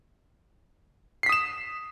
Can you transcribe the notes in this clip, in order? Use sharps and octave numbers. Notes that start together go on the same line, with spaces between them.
D#6 B6 C7 E7